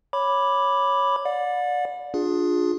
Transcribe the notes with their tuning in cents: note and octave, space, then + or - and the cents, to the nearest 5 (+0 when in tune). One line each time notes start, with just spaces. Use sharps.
C#5 +0 B5 +0 D6 +0
D5 +0 F#5 -40
D4 +0 F4 +20 G#4 +0